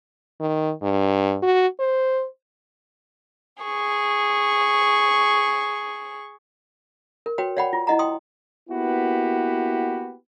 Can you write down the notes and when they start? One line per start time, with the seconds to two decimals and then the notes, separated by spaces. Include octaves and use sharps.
0.40 D#3
0.82 G2
1.43 F#4
1.79 C5
3.63 G#4 C#6
7.26 A#4
7.38 F#4 B4 C#5 G5
7.57 C#5 D5 F#5 G5 B5
7.73 F4
7.87 E4 D#5 F#5 A#5
7.99 G5 C6 D#6
8.70 A#3 B3 E4 F#4 G4 B4